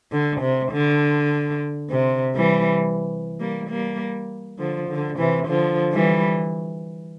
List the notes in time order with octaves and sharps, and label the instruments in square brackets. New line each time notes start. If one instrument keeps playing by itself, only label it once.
[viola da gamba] D3
C3
D3
C3
E3 G3
G3 A#3
G3 A#3
D3 F3
D3
C3 E3
D3 F3
E3 G3